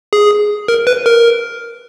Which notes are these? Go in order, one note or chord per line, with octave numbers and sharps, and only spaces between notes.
G#4
A#4
B4
A#4